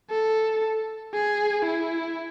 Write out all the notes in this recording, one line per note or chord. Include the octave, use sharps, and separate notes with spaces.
A4
G#4
E4